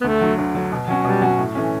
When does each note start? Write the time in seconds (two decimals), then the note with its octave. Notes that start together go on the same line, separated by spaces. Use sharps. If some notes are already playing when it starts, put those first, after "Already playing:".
0.01 B3
0.04 D2 A3
0.21 D3 F#3
0.39 D2
0.55 D3 F#3
0.72 B2
0.88 F#3 C#4 F#4
1.05 B2 G3
1.22 F#3 C#4 F#4
1.38 A2
1.55 E3 A3 C#4